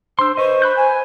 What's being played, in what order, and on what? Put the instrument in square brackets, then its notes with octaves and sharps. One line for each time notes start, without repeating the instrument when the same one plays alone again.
[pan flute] D4 [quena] C5 [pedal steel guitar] C6 E6
[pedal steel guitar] B4 D#5 [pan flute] C5 [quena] C#6
[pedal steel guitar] B5 F#6 G6
[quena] G#5